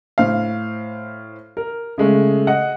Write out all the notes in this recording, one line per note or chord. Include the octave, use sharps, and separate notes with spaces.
A2 C5 F5
A#4
C#3 G#3 A3
D#5 F#5